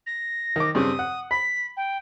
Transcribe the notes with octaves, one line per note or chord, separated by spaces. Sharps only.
A#6
D#3 D6
G2 C#3 C4 D#6
F#5
B5 B6
G5